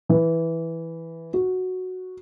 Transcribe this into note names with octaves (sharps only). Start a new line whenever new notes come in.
E3
F#4